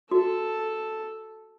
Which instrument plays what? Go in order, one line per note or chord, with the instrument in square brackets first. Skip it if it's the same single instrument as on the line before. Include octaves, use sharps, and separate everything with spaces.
[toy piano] F#4 [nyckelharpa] A4